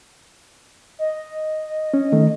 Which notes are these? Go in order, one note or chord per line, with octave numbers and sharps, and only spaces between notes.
D#5
C#4
D#3 A3